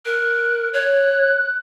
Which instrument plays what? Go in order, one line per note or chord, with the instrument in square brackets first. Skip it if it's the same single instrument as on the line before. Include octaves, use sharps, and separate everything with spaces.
[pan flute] A#4 [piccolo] F#6
[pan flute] C#5 [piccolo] F#6